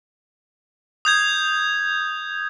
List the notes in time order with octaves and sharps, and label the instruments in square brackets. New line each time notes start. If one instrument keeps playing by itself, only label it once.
[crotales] D#6 G6 G#6